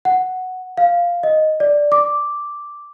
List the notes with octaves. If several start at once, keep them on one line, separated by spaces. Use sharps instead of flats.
F#5
F5
D#5
D5
D6